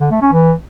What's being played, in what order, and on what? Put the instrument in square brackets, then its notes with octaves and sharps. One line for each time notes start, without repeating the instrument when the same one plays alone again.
[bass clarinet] D3
A3
C#4
E3